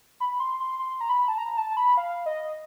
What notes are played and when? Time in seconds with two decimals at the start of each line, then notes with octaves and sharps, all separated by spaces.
0.20 B5
0.40 C6
0.60 C6
0.79 C6
1.01 A#5
1.09 B5
1.28 A5
1.38 A#5
1.57 A5
1.77 B5
1.97 F5
2.26 D#5